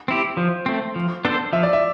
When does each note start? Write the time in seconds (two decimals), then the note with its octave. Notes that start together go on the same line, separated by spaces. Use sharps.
0.08 C4 E4 G4
0.37 F3 C5
0.66 A3 C4
0.96 F3
1.25 B3 D4 A4 C5
1.53 F3 E5
1.63 D5
1.73 E5